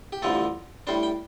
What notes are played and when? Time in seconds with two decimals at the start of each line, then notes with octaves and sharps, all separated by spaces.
0.12 G4
0.22 A1 G2 D3 F3 A3 A4
0.87 A2 G3 D4 C5
1.03 G5